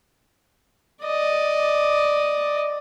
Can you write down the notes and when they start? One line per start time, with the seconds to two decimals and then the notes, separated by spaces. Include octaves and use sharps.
1.05 D5 D#5